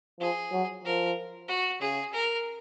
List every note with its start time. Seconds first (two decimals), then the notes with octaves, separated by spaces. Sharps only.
0.20 F3 G#4
0.52 F#3
0.84 F3 A#4
1.48 F#4
1.81 C#3 G#4
2.13 A#4